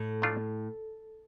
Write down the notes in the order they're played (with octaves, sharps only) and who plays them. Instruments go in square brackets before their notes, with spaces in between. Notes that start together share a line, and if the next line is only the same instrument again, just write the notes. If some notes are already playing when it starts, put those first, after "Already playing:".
Already playing: [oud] A2
[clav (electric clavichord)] A#2 F3 A3 D4 F4